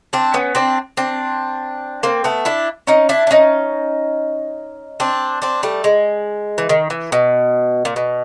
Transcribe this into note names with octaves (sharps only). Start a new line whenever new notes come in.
C4 D4
B3 C#4
C4 D4
C4 D4
A#3 C4
A3 B3
D4 E4
C#4 D#4
D4 E4
D4
C#4 D#4
C4 D4
C4 D4
G3 A3
G#3
E3
D#3
E3
B2
A#2
B2